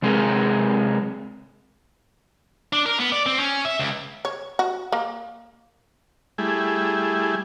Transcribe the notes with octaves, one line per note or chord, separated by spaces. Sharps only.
C3 G#3 C4 G#4 A#4
D4
A#4
B3
D5
C4
C#4
E5
C#2
C#5
F#4
A#3
G3 A3 E4 G#4